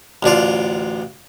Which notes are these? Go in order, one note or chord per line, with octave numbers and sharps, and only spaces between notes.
A1 D2 D4 F4